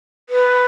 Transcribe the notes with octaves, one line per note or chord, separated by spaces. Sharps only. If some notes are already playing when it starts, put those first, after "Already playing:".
B4